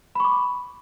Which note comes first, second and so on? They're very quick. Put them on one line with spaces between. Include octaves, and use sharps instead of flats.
B5 C#6 D6